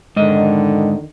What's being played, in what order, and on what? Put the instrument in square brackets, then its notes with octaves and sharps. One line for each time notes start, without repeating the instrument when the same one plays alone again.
[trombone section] F2 D3 D#3 [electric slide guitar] G#2 D#5